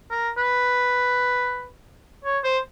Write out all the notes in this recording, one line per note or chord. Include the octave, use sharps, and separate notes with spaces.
A#4
B4
C#5
C5